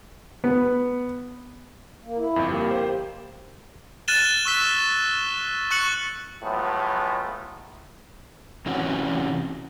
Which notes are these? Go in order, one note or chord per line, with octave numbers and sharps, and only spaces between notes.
B3
A#3
E4
G1 F2
A#3 G4
C5
F6 F#6 A6 D#7 E7 G7
C#6 E6 B6 G7
C#6 F#6 C#7 F#7
A2 F3 F#3 G#3 B3
C3 E3 C#4 F#4